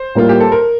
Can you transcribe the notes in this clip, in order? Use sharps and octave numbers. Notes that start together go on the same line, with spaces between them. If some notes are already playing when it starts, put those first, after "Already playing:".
Already playing: C5
A2 G3 A#3 F4
G4
A4
A#4